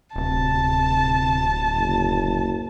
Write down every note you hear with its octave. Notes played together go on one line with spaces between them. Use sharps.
D1 C3 A5
F#1